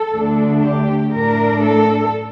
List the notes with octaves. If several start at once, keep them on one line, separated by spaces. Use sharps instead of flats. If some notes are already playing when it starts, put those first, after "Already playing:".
Already playing: A4
D2 D3 A3 D4
G4
A2 A3 D4 A#4
A4